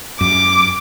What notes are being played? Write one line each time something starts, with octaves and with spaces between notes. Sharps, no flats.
F#2 D6